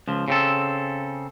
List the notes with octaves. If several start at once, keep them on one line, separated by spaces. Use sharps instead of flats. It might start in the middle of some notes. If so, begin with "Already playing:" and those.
C#2 F3
C#3 C4 A4